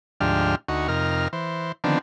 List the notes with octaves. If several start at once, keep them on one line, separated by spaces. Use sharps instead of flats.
D2 G#2 F3 D4 G4 F6
D2 D#4 F#4 C#6
F2 C3 D#4 A#4 F6
E3 C5
D3 D#3 F3 B3 C4 D4